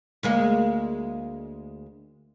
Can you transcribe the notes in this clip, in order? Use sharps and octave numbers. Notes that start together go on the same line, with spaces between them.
D2 G#3 A#3